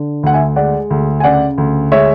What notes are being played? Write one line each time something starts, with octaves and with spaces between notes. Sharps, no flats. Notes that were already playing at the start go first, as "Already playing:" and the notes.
Already playing: D3
D2 F#5
E5 G#5
G#3 D5 F#5
D2
G#5
C#3 D5 F#5
D2
G#3 C#5 E5